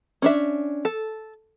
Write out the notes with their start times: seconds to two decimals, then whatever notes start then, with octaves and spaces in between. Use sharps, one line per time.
0.22 C#4 D4 E5
0.85 A4